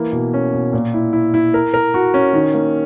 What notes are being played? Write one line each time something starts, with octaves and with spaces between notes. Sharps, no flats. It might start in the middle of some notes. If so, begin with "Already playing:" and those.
Already playing: E3 A#3
B2
C#4
B2
A#2
E4
E4
E4
A#4
A#4
F#4
C#4
D#3
A#3